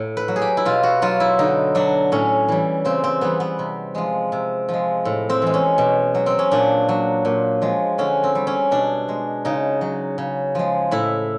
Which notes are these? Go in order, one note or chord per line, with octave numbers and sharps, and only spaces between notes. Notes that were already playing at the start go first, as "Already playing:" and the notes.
Already playing: A2
B4
F#3
G#4
G4
E4
B2 F4
F#4
F#3 F4
E4
D3 D#4
F#3 D4
A2 C#4
E3 G3
C#3 C4
C4
E3 G3 B3
B3
C3
F3 G#3
C3
F3
G#3
A2
C4
E3 G#3
C#4
B2
F#3
C4
C#4
A#2 D4
F#3
A#2
F3 G#3
D3 C#4
C4
G3
C#4
B2 D4
G#3
C#3 D#4
F#3
C#3
F3 G#3
A2 E4